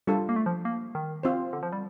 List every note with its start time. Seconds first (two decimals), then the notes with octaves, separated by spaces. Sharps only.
0.07 G3 D4 F4 A4
0.29 A#3
0.36 A3
0.46 F3
0.65 A#3
0.95 D#3
1.23 C4 F4 C5
1.53 D3
1.63 F3
1.73 G3